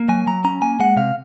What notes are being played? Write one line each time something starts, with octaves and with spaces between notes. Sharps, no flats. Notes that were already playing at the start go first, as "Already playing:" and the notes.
Already playing: A#3
F#3 G#5
F#3 A#5
C#4 A#5
A#3 G#5
G#3 F#5
C3 F5